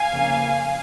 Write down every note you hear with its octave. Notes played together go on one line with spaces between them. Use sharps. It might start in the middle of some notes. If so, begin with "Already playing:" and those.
Already playing: F5 G#5
F2 C#3 F3 A#3